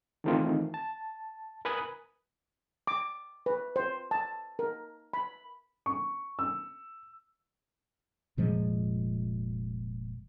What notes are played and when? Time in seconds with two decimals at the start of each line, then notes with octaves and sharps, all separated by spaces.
0.24 D#3 E3 A3 C4 D#4 F4
0.74 A5
1.65 A#4 B4 G#5 B5 D#6 F#6
2.87 D6
3.46 B4
3.76 C5
4.11 A5
4.59 A#4
5.13 B5
5.86 C#6
6.39 E6
8.37 F1 A#2 F3 G#3